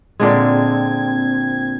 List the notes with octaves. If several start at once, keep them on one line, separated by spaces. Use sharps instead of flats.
A#2 D3 G#3 C4 G#6